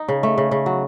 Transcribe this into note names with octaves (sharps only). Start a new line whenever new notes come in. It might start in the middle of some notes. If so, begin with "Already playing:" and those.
Already playing: D#4
C#3
A3
C#3
C#3
F#3